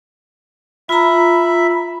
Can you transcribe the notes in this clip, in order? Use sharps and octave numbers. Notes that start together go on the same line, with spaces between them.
F4 E5 A#5 B5